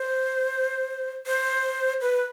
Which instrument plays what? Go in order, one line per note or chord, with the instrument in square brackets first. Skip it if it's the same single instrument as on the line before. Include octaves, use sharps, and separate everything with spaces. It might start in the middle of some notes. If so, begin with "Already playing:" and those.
Already playing: [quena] C5
C5
B4